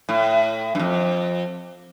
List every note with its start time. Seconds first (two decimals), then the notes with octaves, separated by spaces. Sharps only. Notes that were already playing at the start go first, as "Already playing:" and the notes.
0.09 A2
0.75 G2
0.79 F2